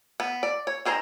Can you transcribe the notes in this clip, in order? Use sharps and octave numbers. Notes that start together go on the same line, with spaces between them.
B3
D5
C#5
D#3 G#4 C5 A#5